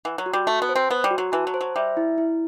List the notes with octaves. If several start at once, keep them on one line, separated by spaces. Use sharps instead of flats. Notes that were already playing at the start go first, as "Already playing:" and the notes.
E3 F#5
F#3
F#4
G3
A3 A5
B3
C5
C4
B3 F#5
G3
F#4
F#3
E3 A5
F#3
C5
F#3
G3 E5
E4
E4